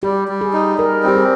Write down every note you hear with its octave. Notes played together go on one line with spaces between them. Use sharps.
G3 G4
G3
G#4
D#4
G3 A#4
C4 G4
G#4